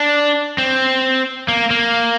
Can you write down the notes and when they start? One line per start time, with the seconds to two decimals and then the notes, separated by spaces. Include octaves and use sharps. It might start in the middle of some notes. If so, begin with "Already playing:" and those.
Already playing: D4
0.58 C4
1.48 A#3
1.70 A#3